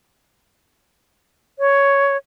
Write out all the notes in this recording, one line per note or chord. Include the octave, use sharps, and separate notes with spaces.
C#5